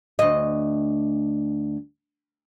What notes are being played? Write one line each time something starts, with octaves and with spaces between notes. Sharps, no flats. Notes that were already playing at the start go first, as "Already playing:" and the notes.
D2 D#5